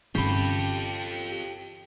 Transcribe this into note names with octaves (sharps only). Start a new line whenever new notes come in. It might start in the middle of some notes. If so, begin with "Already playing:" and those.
G1 C3 C#4 F4 G4 A4 B5